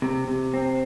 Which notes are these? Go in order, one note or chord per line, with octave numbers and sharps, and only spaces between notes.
C3
C3
C4